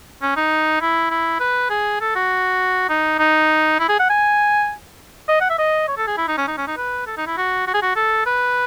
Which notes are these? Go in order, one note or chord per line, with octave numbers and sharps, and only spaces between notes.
C#4
D#4
E4
E4
B4
G#4
A4
F#4
D#4
D#4
E4
G#4
F#5
G#5
D#5
F#5
E5
D#5
C#5
A4
G#4
E4
D#4
C#4
D#4
C#4
D#4
B4
A4
D#4
E4
F#4
F#4
G#4
F#4
A4
B4